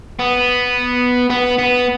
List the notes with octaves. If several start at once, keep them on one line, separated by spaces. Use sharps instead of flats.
B3
B3
B3